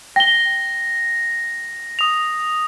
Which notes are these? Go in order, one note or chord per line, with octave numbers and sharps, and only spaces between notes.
G5 A#6 G7
D#6 F7